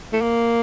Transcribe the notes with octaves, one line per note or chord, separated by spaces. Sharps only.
A3
A#3